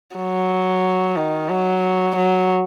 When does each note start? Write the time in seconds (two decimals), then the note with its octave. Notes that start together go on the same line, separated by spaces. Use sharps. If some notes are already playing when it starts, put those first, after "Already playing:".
0.16 F#3
1.16 D#3
1.49 F#3
2.16 F#3